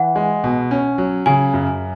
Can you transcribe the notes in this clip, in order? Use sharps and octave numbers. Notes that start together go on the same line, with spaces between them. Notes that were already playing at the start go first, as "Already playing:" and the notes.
Already playing: E3 F#5
G#3
B2
C#4
F#3
C#3 G#5
F#2